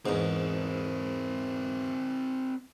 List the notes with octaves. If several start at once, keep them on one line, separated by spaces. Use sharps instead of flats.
E2 G#2 C4 A#4